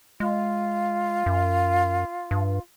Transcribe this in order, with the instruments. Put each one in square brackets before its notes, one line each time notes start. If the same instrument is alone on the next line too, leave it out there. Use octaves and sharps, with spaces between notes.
[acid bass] G#3 [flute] F4
[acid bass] F#2
G2